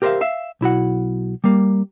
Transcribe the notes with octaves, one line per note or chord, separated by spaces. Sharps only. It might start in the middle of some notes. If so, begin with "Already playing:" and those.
G4 A#4 C5 D5 E5 F5
E5 F5
B1 E4 F#4 F#5
G3 A#3